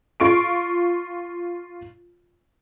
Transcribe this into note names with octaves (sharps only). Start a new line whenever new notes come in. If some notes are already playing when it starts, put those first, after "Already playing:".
F4 C#6 D7